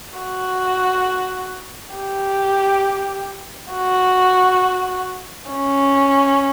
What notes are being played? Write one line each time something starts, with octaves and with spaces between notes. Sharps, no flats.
F#4
G4
F#4
C#4